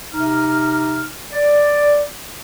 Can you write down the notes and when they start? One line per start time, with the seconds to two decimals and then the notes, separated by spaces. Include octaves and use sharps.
0.14 C3 D#4 F6
1.33 D5